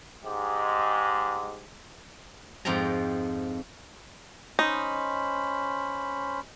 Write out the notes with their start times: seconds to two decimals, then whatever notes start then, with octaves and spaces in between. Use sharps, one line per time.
0.23 G#2 G#3 G4
2.65 F2 G#2 F3 G5 A#5
4.59 C#4 D#4 C5 B5